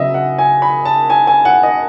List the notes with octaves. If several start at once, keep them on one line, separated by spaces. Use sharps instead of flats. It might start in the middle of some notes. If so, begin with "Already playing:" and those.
Already playing: C#3 F#3 B3 D#5 E5
F#5
G#5
B5
A5
G#5
G#5
F#5
D#5